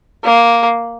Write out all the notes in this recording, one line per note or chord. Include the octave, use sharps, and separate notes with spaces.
A#3